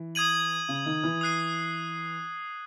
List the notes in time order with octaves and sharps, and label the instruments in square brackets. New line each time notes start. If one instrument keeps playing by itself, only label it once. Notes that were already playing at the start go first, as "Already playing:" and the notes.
Already playing: [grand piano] E3
[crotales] D#6 G#6 D#7 F#7
[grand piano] C#3
D#3
E3
[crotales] D#6 F#6 C7 D#7